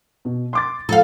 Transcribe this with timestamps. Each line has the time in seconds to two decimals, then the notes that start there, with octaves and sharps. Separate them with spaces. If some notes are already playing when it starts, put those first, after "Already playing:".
0.25 B2
0.53 C6 D6 A6
0.89 F3 A4 F5